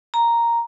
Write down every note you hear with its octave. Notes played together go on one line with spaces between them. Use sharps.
A#5